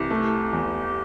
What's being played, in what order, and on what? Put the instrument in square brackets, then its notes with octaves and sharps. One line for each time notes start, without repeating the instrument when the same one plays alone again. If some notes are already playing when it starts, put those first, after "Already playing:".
Already playing: [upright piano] C2 E3 [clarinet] G4
[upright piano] A3
E2